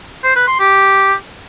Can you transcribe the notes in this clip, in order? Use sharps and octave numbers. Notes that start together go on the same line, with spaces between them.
C5
B4
C6
G4